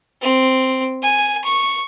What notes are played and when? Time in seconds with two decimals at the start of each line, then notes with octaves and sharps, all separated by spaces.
0.21 C4
1.02 G#5
1.44 C#6